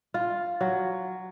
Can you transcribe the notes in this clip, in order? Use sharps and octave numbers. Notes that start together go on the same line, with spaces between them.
F4
F#3